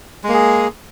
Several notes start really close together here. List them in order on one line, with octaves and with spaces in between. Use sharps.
G#3 A#3 G#4